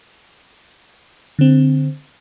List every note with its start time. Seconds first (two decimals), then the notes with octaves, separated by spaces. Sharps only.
1.39 D3 C4